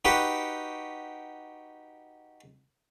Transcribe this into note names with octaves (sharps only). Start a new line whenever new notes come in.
D#4 F#4 G4 B4